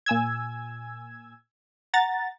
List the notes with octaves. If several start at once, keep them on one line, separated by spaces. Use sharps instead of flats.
A#2 G#5 E6 G#6
F#5 A#5 A6